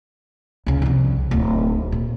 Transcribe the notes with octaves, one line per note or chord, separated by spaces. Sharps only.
C#2 C#3
C2 F2
D1 D#3
A#2